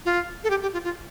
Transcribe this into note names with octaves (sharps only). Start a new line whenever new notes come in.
F4
A4
G4
G4
F4
F4